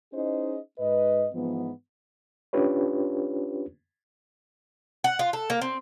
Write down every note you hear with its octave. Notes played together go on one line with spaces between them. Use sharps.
C#4 D#4 E4 G#4 C5 D#5
G#2 B4 D#5
G#2 E3 F3 B3
C#4 D4 F4 G4 B4 C#5
F#5
F4
A4
A#3
C4